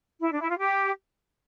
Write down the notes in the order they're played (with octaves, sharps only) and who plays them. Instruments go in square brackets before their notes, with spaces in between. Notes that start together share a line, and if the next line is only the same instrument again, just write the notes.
[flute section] E4
D4
E4
F4
G4